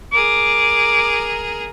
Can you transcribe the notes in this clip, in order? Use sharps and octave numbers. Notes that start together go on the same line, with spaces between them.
G#4 A#4 D6